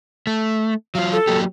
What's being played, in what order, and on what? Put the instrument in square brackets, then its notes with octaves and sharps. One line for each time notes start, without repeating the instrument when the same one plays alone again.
[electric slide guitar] A3
[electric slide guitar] F#3 F4 [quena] F5
[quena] A4
[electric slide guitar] F#3 A#3 G4